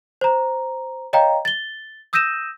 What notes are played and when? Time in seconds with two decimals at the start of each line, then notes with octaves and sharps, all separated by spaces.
0.21 C5 A#5
1.13 C#5 D#5 F5 G5 A#5
1.45 A6 G7
2.13 D#6 E6 G6 A#6 D#7 E7